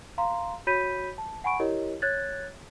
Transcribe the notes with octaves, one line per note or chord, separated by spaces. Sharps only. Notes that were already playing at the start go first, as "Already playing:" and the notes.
F5 A#5 C6
F#4 C#5 B5 G6 B6 D#7
A5
F#5 G#5 B5 C#6 D7
E4 G4 A#4 C#5 D#5
C#5 F#6 G#6 A6